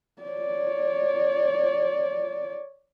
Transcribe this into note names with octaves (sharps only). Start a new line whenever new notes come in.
C#5 D5